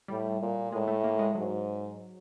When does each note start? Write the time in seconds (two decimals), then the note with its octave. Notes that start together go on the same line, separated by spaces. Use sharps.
0.08 A2 G3
0.40 A#2
0.72 A2 G#3
0.88 A3
1.04 A#3
1.19 G#3
1.35 G#2 F#3